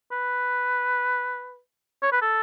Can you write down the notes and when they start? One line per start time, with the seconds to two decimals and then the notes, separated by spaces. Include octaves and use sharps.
0.12 B4
2.02 C#5
2.12 B4
2.22 A4